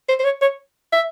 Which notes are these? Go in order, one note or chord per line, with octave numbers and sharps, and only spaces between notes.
C5
C5
C#5
C#5
E5